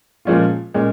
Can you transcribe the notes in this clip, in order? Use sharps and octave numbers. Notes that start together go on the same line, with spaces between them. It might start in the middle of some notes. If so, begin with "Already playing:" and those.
A#2 F3 G#3 C#4 F4
A#2 G#3 C#4